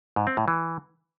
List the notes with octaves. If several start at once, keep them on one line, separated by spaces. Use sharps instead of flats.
G#2
C4
A2
E3